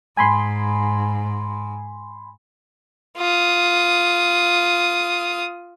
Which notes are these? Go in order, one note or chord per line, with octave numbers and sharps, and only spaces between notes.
G#2 G#5 B5 C6
F4 D#6